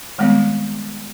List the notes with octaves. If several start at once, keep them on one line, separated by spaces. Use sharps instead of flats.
D#3 G3 G#3 B3 C4